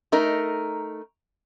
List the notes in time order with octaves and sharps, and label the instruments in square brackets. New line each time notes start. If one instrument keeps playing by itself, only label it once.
[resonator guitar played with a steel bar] A3 D#4 A#4